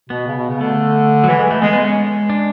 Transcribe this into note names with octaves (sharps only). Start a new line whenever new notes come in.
B2 B3
C#3
B2
C#3
D3 A3
F#3
E3 G#3
G#3
E3
A3
G#3 B3
B3
G#3
C#4
D4